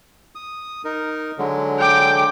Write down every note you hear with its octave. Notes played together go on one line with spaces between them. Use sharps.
D#6
D#4 A#4
D3 F#3 G#3
G5 D6